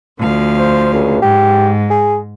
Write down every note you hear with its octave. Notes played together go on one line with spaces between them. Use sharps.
D2 F3 F5
C5
C#2
G#2 G4
G#4